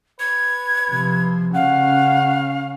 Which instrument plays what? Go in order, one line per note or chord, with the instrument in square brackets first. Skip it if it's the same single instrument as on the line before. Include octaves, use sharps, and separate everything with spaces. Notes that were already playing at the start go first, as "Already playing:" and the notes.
[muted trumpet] B4 [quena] G#6
[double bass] C3 F3
[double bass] C#3 C#4 [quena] F5 [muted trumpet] F#5